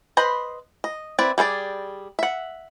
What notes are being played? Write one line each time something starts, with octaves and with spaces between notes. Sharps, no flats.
B4 C5 D#5 B5
D#5
C4 E4 B4 D5
G3 G#4 C5 D5
E5 F#5